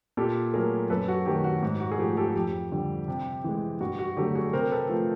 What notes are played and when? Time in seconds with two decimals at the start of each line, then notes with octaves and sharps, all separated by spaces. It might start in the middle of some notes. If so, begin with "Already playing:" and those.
0.17 A#2 G4 A4
0.53 F#3 A3 G#4 A#4
0.90 F#2 A4 B4
1.08 F#4
1.26 D#3 F#3 A3 G4
1.44 F#4
1.63 G#2
1.80 F#4
1.92 G#4
1.99 F3 A3 G4
2.17 G4 A4
2.35 F2 G4
2.72 D3 G3
3.08 C3
3.44 E3 G#3
3.81 G2 F#4
3.99 F#4
4.17 D3 F#3 A3 G4
4.35 F#4 G#4
4.53 C3 A#4 C5
4.71 A4 B4
4.89 F3 A3